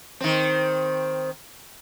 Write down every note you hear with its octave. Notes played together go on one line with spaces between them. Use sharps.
D#3 C4